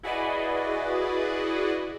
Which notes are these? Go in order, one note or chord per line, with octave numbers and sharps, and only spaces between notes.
E4 F#4 G#4 B4 D5 D#5